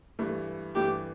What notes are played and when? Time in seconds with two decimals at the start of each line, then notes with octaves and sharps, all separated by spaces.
0.19 G2 E3 A3
0.75 G2 E3 A3 G4